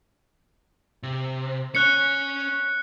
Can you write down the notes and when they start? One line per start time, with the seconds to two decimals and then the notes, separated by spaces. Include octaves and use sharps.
1.03 C3
1.75 C#4 C#5 F#6 C#7